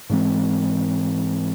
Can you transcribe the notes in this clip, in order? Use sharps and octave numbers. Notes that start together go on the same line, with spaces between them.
G#2 E3 G#3 C4